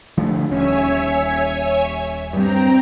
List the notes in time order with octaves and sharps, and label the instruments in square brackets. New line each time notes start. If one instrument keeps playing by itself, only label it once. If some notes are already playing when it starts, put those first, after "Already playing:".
[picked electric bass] D3 F3 A3
[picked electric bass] D#1 C#4 [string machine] C#5 E5 G#5
[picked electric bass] G2 G3 [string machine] C4 G5 A#5